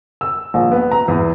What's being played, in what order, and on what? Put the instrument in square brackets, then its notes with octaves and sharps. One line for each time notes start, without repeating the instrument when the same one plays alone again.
[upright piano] E6
A#1
B3
A#5
E2